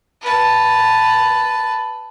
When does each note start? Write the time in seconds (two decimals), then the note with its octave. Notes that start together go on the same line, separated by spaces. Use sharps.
0.21 B4 A5